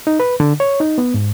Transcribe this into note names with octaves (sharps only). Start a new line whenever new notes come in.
D#4
B4
D3
C#5
D#4
B3
G#2